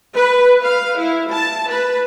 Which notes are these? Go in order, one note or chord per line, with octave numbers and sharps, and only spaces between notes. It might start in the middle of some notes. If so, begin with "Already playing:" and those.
B4
F5
E4
A5
B4